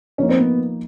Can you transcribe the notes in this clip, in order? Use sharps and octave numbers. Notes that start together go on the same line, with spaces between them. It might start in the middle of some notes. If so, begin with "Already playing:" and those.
F3 A#3 C#4 D#4
C4
B3